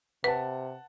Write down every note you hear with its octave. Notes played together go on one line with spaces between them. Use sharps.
C3 B4 F#5 A5